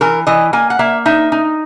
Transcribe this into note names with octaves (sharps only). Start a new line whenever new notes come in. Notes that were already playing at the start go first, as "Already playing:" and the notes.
E3 A#4
E3 D#5
A#3 G#5
F#5
A#3 E5
D#4 E5
D#4